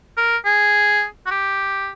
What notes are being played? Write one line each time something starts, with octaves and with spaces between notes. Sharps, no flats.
A#4
G#4
F#4
G4